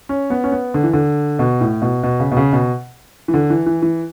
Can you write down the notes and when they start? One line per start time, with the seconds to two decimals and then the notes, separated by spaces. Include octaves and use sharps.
0.09 C#4
0.30 B3
0.44 C#4
0.52 B3
0.74 D3
0.83 E3
0.93 D3
1.39 B2
1.61 A2
1.82 B2
2.03 B2
2.20 C#3
2.31 B2
2.37 C#3
2.53 B2
3.28 E3
3.34 D3
3.50 E3
3.66 E3
3.82 E3